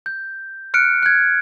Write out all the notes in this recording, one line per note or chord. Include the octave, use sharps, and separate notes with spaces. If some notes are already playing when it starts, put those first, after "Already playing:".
G6
F6 F#6 C#7 D7
F#6 G#6